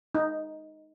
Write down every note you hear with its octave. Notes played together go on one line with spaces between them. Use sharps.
D#4